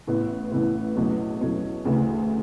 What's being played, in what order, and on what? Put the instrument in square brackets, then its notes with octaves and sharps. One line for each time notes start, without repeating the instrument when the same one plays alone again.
[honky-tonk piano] A1 A2 E3 B3 E4
A1 A2 E3 B3 E4
E2 B2 F#3 A3 C#4
E2 B2 F#3 A3 C#4
D2 C#3 E3 A3